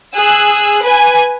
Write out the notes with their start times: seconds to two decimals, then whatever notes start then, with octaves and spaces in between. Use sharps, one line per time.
0.15 G#4 E6 F#6
0.84 B4 G#5